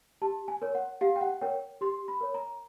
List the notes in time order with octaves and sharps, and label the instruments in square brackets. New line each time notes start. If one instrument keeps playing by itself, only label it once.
[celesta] G4 A5
G#5
A#4 C#5
F#5
G4 F5
G5
F#5
A#4 C#5 G5
G4 C6
B5
A#4 C#5
A#5